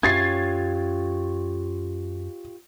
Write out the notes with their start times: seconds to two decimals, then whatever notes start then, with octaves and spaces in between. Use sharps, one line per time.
0.03 F#2 C#4 F4 G4 C#5 G#6 A6 C7